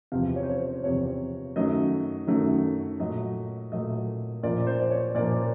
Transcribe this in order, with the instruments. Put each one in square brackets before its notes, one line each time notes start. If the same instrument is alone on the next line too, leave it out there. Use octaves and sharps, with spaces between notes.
[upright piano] E2 C3 F3 F5
C#5
C5
C#5
C5
E2 C3 F3 C#5
F#2 D#3 F#3 A3 D#5
F#2 D#3 F#3 A3
A#2 F#3 A3 D#5
A#2 F#3 A3 D#5
A#2 F3 A#3 D5
C5
D5
C#5
A#2 F3 A#3 D5